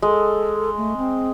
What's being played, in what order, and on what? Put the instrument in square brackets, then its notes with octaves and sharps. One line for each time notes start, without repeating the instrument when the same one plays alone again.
[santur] G#3 [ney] A4
[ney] A3
C4